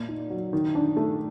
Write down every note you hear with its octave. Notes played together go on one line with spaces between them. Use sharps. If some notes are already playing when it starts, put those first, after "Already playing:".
Already playing: A#2
D#4
F#3
D#3
D4
A3